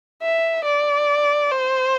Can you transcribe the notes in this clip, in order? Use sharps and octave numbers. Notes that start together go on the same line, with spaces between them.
E5
D5
C5